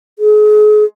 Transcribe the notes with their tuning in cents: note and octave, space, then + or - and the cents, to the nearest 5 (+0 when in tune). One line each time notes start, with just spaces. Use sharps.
G#4 +35